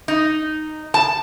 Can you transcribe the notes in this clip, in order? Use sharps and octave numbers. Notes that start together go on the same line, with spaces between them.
D#4
A5